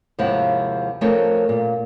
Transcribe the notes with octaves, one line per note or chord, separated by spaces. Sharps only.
D#2 G#2 C3 F3 E4 F#5
F3 A3 C4 C#4 A#4 C#5
A#2